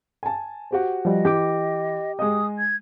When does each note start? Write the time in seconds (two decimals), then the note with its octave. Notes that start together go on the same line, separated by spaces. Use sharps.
0.23 G#5 A5
0.71 F#4 G4 C5
1.05 F3 G3 D#5
1.25 E3 G4 G5 D6
2.19 G#3 D#5 D#6
2.59 G#6